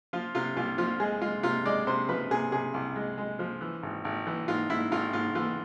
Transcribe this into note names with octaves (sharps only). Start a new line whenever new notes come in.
F3 F4
C3 F4
C2 F4
F3 F4
G#3 G#4
G#3 F4
C3 F4
G#3 D5
C3 C5
F3 B4
C3 G#4
C3 G#4
C2
G#3
G#3
F3
E3
G#1
G#1
E3
G#2 F4
G#2 E4
G#1 F4
G#2 F4
E3 F4